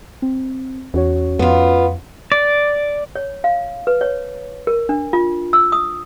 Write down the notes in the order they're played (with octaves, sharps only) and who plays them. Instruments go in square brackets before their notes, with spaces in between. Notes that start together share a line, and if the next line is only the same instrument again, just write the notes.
[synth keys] C4
[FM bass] E2 [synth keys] C#4 F#4 C#5
[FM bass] F2 [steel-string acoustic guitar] B3 F4
[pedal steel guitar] D5
[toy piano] C#5
F5
B4
C#5
A#4
D4
F4
E6
D#6